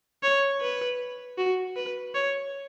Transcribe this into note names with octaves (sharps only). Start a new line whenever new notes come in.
C#5
B4
F#4
B4
C#5